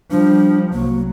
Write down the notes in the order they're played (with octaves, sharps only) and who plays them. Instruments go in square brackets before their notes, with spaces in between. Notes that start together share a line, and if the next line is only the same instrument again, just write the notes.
[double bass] F3 G3 [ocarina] D4
[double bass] C2 F#3 [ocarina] A#3